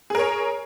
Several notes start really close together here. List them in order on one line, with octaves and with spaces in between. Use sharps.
G#4 A#4 C#5